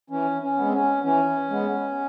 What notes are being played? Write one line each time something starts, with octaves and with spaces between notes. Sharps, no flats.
E3 C#4
C#4
G#3 B3
C4
C#4
E3 C#4
G#3 B3